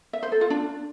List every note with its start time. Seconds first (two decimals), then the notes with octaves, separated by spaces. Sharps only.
0.13 E5
0.23 C5
0.32 A4
0.41 F4
0.50 D4